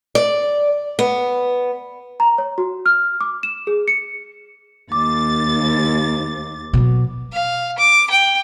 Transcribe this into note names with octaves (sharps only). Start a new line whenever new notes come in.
D5
B3
A#5
C#5
F#4
F6
D6
E7
G#4
C#7
D#2 D6 A6
B2 F#3
F5
D6
G5